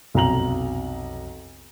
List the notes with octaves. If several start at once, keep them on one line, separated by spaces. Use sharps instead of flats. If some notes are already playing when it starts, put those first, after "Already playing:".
B1 F2 C3 A#5 F7 F#7